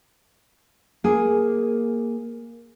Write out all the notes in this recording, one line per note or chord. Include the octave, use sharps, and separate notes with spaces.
A#3 G#4